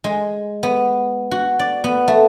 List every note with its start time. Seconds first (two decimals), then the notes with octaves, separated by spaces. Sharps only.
0.04 G#3
0.63 B3
1.31 F#4
1.59 D5
1.84 B3
2.08 A3